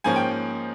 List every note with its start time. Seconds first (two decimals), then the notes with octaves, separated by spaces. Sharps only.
0.04 G#2 F3 A#3 C#4 G#5
0.16 G5